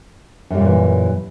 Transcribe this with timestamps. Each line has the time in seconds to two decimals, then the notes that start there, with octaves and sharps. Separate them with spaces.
0.50 F#2
0.54 G3
0.58 A#2
0.62 F#3
0.65 E3